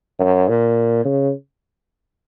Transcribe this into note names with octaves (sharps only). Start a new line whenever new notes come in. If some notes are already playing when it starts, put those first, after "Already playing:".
F#2
A#2
C#3